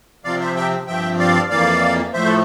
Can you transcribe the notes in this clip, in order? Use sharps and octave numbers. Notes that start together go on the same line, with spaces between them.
C3 F3 C4 D5 F5
C5 E5
E5 G5
G2 F3 C4 E5 G5
D5 F5
F2 E3 A#3 D5 F5
A2 F3 A3 C5 E5
A4